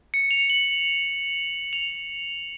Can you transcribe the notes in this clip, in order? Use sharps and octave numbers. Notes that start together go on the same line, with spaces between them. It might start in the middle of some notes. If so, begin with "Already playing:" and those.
C#7
F7
F#7
F7